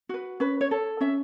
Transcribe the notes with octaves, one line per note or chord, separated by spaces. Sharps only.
F#4 B4
C#4 B4
C#5
A4
C#4 E5